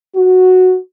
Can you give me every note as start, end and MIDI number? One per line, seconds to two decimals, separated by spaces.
0.16 0.76 66